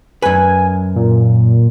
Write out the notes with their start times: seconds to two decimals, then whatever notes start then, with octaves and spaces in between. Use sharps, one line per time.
0.22 F#2 B4 G#5
0.95 A#2